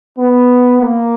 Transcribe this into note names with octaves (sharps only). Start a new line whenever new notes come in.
B3
A#3